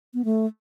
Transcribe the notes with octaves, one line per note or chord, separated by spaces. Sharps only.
B3
A3